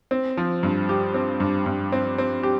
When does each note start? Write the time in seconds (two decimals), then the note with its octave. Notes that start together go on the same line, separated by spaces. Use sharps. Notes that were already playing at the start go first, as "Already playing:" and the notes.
0.11 C4
0.37 F3
0.63 G2
0.89 G4
1.14 C4
1.40 G2
1.66 G2
1.92 C4
2.18 C4
2.43 G4